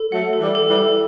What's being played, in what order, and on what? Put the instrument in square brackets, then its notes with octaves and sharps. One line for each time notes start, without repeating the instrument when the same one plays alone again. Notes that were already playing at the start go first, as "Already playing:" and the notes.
Already playing: [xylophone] A4
[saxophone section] F#3 A3 [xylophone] F#5
[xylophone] A4
[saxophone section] E3 G3
[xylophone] A4
[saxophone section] E3 G3
[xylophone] A4